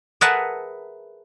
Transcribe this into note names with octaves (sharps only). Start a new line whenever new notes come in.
G#4 A#4 B4 E5 F#5 A5